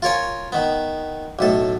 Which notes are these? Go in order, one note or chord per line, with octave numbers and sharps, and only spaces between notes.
F4 A#4 C#5 G#5
D#3 B3
B1 A2 A4